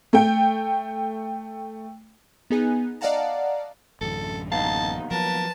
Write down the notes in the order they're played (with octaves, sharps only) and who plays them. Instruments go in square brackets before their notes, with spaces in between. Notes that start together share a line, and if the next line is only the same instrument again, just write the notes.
[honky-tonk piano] A3 G5
[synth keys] B3 D#4 G#4 G#5 F#6
D5 D#5 F5 F#5 A5 A#5
[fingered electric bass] A1 F#2 D3 [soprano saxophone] A4
[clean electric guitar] D#2 B3 F5 [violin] D#4 [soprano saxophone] A5
[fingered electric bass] F3 F#3 [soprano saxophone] A#4 [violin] B4 A5